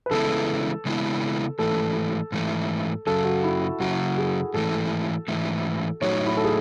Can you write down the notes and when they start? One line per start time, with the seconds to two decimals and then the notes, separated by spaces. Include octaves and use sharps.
0.06 B4
0.11 C#3 E3 G#3 B3 E4 A4
0.85 C#3 E3 G#3 B3 E4
1.59 G#2 E3 A3 A4
2.32 G#2 E3 A3
3.07 F#2 C#3 F#3 A4
3.25 F#4
3.44 E4
3.62 F#4
3.80 F#2 C#3 F#3 F#4
4.18 G#4
4.54 G#2 E3 A3 A4
5.28 G#2 E3 A3
6.02 A2 F#3 A3 D#4 F#4 C#5
6.26 E4
6.37 A4
6.44 G#4